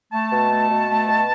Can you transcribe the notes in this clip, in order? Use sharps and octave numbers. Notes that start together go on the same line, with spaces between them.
A3 A5
B2
A3
B2
A3
B2